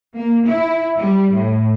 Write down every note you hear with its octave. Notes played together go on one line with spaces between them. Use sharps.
A#3
E4
G3
A2